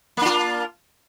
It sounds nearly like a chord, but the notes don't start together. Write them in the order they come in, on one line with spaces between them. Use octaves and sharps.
A#3 D4 F4